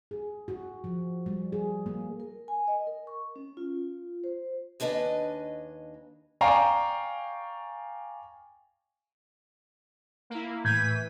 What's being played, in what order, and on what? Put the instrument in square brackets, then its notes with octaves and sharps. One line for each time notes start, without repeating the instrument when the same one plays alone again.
[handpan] G#4
F#4
F3
G3
G#4
A#3
[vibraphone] A#4
G#5
D#5
A#4
C#6
C#4
F4
C5
[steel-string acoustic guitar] D#2 D4 B4 D#5 G#5
[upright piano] D5 F5 G5 G#5 A#5 C#6
[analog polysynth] A#3 E4
[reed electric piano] A2 G6 G#6 [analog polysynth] E3 B6 D#7